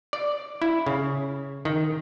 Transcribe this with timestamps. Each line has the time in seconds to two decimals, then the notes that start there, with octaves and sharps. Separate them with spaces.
0.13 D5
0.62 E4
0.87 C#3
1.65 D#3